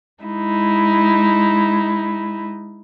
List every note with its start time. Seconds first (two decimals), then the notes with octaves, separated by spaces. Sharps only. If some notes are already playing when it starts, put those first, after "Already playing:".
0.23 G#3 D#4 E4